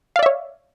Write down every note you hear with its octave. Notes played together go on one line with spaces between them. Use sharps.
C#5 D5 E5 F5